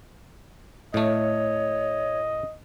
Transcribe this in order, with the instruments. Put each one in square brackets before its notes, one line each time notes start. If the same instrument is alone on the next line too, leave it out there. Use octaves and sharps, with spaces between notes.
[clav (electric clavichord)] A2 A3 [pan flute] C#5 [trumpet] D#5